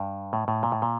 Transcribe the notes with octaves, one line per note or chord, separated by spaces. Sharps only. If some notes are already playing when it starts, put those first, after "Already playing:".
Already playing: G2
A2
A2
A#2
A2
A#2